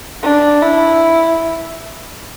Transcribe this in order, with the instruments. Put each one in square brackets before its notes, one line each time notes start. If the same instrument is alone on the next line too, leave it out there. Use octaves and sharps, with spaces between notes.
[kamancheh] D4
E4